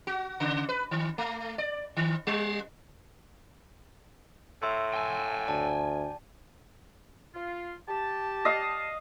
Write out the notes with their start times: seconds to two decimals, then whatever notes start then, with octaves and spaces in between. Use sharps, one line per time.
0.07 F#4
0.40 C#3
0.69 B4
0.91 D#3
1.18 A3
1.58 D5
1.97 D#3
2.27 G3
4.62 A2 E5 C6 E6
4.93 G5 G#5
5.48 D2 D5 A5
7.34 F4
7.89 G4 A5
8.45 D#5 F5